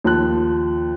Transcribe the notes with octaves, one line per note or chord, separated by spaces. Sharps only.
D#2 F3 A5 F#6